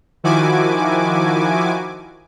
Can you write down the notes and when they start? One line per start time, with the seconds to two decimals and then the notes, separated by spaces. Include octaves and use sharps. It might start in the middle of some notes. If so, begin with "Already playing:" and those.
0.24 D#3 F3 E4 F#4 G#5 D6